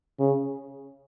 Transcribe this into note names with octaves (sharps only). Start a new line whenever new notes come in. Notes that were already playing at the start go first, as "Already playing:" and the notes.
C#3